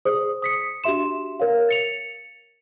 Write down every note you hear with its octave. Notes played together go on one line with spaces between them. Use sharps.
G#4 C5 D5 D#6
D#6 B6 C#7
D4 F#4 G4 E5 C6 E7
A#4 C#5 F5
A6 C#7 F7